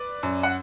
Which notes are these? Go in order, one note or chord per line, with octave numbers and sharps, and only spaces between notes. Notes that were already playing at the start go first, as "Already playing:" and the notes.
Already playing: B4 D5
F#2
F#5